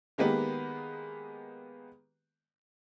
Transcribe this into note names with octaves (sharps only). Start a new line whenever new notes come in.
D#3 G#3 A#3 B3 G4 B4